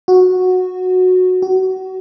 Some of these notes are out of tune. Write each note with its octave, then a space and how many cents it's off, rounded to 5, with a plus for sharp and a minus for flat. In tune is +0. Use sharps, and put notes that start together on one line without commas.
F#4 -10
F#4 +25